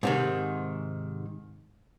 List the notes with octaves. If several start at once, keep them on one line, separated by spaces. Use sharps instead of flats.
G#2 C3 D#3